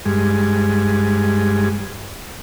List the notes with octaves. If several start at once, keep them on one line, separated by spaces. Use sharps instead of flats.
G2 G#3